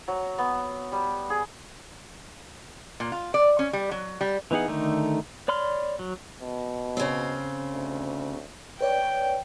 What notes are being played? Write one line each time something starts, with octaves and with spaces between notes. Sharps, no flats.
F#3
B3
G3
G#4
A#2
F4
D5
C#4
G3
F#3
G3
E3 B3 D#4 G#4 F#5
D3 D#3 A3 D#4
C#5 D5 B5 C6 F6
F#3
B2
C#3 C4
D2
B4 C#5 D5 G5